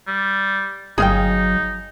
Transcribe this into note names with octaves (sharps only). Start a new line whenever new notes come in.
G3
G1 F#3 D#4 G#4 F5 G5